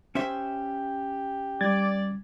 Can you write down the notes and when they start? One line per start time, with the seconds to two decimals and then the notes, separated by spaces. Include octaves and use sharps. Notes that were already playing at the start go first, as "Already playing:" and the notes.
0.15 C#4 G4 C5 E5
1.61 G3 D5 G#6 A6